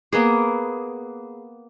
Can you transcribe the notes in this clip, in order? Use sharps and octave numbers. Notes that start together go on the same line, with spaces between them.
A#3 B3 G#4